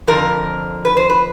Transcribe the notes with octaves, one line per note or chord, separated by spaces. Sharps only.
F2 D3 F3 A#4
B4
C5
B4